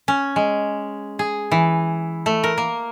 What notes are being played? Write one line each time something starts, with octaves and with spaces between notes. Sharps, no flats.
C#4
G#3
G#4
E3
A3
A#4
A#3